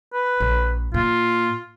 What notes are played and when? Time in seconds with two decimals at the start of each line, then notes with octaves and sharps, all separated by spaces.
0.13 B4
0.40 A#1
0.94 A#2 F4